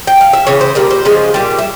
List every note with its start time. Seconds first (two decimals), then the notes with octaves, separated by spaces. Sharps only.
0.07 G5
0.21 F5
0.33 E5
0.47 C#3 E3 C#5
0.61 C5
0.75 A#2 G3 A#4
0.91 C5
1.05 C#3 F3 G#3
1.34 A#2 G3
1.58 E5